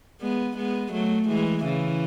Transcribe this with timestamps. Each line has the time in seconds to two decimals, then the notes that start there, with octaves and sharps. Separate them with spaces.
0.21 G#3 B3
0.56 G#3 B3
0.93 F#3 A3
1.29 E3 G#3
1.65 C#3 E3